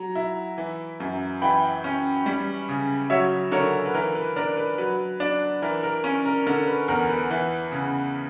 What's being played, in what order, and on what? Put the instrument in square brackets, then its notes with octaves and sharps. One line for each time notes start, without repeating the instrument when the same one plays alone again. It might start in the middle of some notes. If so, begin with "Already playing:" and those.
Already playing: [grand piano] F#3 A#5
E4
E3
F#2
E3 G5 B5
C#4
G3
C#3
F#3 C#5 E5
D3 A#4 C#5
B4
E3 A#4
B4
D4 A#4
B4
F#3 B4
D4
E3 A#4
A#4
C#4
A#4
D3 A#4
B4
E2 A#4
B4
E3
C#3